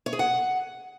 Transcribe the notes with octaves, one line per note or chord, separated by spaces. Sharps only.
C#5
G#4
F#5